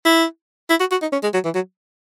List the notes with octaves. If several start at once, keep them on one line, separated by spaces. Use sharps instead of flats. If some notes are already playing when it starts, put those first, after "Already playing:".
E4
E4
F#4
F#4
D#4
C#4
G#3
F#3
E3
F#3